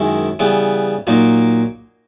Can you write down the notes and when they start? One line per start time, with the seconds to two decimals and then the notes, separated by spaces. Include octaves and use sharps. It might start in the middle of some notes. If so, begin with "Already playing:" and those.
Already playing: F#2 D#3 G#3 C#4 E4
0.39 C#3 E3 G3 B3
1.07 A#2 F#3 A#3 D#4